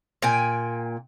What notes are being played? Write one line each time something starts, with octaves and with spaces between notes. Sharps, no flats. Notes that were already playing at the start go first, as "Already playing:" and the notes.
A#2 G5 G#5